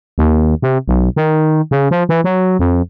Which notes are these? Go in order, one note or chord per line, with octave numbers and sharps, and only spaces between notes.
D#2
C3
B1
D#3
C#3
F3
E3
F#3
F2